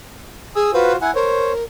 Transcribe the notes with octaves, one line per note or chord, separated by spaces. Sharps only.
G#4 G#5 D#6 E6
F4 F#4 B4 C5
E4 F#5 G#5
A#4 C5 C#5